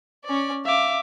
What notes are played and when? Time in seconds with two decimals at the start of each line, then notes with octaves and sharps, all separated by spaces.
0.25 C#4 D5
0.65 E5 F5 D6